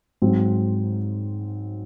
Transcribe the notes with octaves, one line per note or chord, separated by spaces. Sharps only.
G#2 F#3 C4